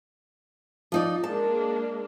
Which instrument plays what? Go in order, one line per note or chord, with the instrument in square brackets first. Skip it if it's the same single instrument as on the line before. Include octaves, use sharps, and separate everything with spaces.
[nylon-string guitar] F3 D#4 D5
[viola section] G#3 A#3 D4 [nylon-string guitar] A5